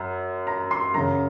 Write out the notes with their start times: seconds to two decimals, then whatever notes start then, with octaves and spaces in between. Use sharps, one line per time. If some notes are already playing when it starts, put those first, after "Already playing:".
Already playing: F#2
0.47 A#5
0.71 C6
0.94 F#2 C#3 A#5